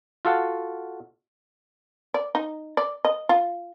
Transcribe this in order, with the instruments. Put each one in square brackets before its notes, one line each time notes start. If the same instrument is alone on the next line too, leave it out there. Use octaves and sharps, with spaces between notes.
[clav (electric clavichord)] F4 F#4 A4 F5 F#5
[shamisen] D5
D#4
D5
D#5
F4